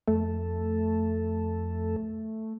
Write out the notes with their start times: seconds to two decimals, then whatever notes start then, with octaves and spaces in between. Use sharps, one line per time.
0.08 F2 A3 A4